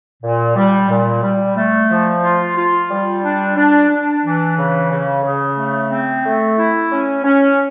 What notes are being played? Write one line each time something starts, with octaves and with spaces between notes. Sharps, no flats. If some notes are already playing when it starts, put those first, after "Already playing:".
A#2
G3
A#2
G3
A3
F3
F4
F4
G3
D4
D4
D4
E3
C#3
C#3
C#3
A3
C4
A3
E4
C#4
C#4